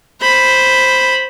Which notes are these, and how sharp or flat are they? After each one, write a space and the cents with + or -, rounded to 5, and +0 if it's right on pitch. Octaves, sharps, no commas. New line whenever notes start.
C5 +0 B5 +0